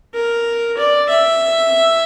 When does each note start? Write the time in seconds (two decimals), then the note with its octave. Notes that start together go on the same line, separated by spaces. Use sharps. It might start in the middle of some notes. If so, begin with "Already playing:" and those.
0.14 A#4
0.77 D5
1.09 E5